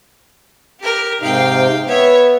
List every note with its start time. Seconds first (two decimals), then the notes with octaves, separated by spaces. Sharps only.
0.80 G4 A#4
1.21 G#2 C3 D#4 F5 G5
1.87 B3 C#5 E5